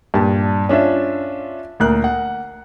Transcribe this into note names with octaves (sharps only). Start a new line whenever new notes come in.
G2 A#2 G4 A5
C#4 D4 F4 E5
D2 A#2 A#4 F#6
F#5